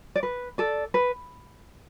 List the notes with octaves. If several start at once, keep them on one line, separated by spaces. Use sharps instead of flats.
D5
B4
A4 D5
B4